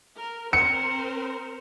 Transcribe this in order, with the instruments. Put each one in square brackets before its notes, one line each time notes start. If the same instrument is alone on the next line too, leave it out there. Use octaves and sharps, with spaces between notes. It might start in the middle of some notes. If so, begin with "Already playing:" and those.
[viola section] A#4
[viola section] C4 A#4 C5 [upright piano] C#7